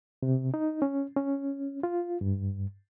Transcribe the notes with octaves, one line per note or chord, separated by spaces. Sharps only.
C3
D#4
C#4
C#4
F4
G2